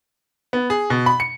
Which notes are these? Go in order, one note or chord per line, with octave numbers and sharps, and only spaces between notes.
B3
G#4
B2
B5
C#7